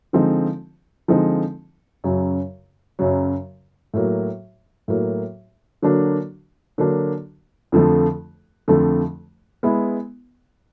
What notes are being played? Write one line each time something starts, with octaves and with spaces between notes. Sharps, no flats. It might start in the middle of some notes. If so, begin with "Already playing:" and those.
D3 F3 G#3 C4 D#4
D3 F3 G#3 C4 D#4
F#2 C#3 F#3
F#2 C#3 F#3
A2 F#3 A#3
A2 F#3 A#3
D3 F#3 A#3 D4
D3 F#3 A#3 D4
F2 D3 F3 A3
F2 D3 F3 A3
G#3 B3 E4